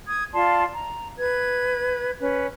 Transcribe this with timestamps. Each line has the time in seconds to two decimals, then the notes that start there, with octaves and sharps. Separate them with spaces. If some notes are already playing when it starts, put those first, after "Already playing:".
0.07 D#6 G#6
0.34 F4 D5 A5 C6
0.74 A#5
1.19 B4 G#6
2.19 C#4 B4